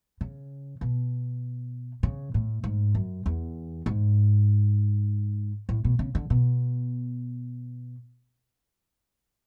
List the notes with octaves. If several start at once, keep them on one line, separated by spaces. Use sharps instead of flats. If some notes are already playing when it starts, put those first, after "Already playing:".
C#3
B2
C#3
A2
G#2
F#2
E2
G#2
A2
B2
C#3
D3
B2